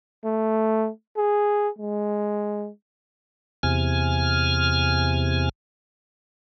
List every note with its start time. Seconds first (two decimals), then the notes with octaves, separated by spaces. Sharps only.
0.25 A3
1.17 G#4
1.79 G#3
3.63 E2 C3 G#5 F6